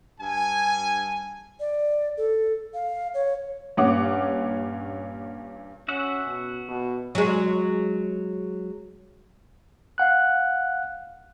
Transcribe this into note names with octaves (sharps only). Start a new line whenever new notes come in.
G2 G#5
D5
A4
F5
C#5
G2 A#2 C#4 C#5 F#5 D6
C#4 F#4 E5 F#5
B2
B2
F#3 G#3
F5 F#5 F#6